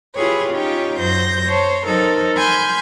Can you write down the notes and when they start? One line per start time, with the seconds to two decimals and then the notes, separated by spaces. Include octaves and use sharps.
0.15 E4 F4 G4 G#4 B4 C#5
0.53 C#4 D#4 F4 G4 C#5 G5
1.00 F#2 C5 G6 A#6
1.46 C5 C#5 A5
1.85 F#3 D#4 A4 A#4 C5
2.36 G#5 B5 C6 F6 G6